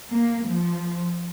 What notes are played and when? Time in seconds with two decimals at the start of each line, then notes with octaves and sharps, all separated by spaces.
0.12 A#3
0.48 F3